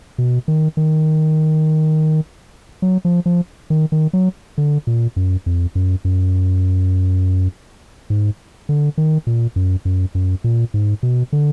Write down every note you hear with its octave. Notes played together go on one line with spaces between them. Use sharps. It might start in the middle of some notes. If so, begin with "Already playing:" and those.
B2
D#3
D#3
F#3
F3
F3
D#3
D#3
F#3
D3
A#2
F#2
F2
F#2
F#2
G#2
D3
D#3
A#2
F#2
F#2
F#2
A#2
G#2
B2
D3